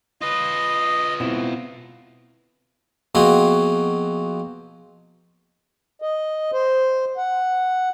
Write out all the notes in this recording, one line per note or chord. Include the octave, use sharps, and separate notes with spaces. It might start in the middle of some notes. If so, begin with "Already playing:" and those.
F4 B4 D#5
B2 C4 E4
B2 F3 A#3 C4 F#4 G#4
D#5
C5
F#5